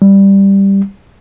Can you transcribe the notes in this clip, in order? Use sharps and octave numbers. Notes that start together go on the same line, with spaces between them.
G3